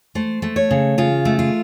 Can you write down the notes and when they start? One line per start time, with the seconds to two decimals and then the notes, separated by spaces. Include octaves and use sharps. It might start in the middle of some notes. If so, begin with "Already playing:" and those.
0.15 A3 C5
0.42 A3
0.56 C#5
0.71 C#3
0.98 C#3 F4
1.25 A3
1.39 F4